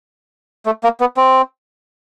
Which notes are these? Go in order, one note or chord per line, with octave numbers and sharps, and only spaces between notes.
A3
A#3
B3
C4